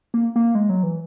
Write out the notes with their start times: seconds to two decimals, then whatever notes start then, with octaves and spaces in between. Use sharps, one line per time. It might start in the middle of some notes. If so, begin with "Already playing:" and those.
0.14 A#3
0.36 A#3
0.55 G#3
0.70 F#3
0.83 E3